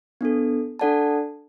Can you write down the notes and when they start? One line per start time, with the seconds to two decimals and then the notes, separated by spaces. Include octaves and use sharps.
0.21 B3 D4 A4
0.79 D4 A4 D5 F#5 A5